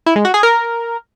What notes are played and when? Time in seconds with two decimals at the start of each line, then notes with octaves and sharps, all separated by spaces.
0.06 E4
0.16 G#3
0.25 F#4
0.34 G#4
0.43 A#4